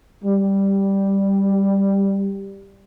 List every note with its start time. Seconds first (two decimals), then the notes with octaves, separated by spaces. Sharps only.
0.24 G3